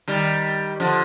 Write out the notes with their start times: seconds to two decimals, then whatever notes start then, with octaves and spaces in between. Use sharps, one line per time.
0.08 D#3 G3
0.80 D3 F3